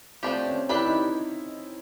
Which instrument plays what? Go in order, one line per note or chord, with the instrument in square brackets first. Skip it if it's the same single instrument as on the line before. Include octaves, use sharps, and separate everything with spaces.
[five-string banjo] F3 A3 D4 G4 [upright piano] C4
[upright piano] C#4
[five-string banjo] D4 G4 B4 [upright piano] E4
[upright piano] D#4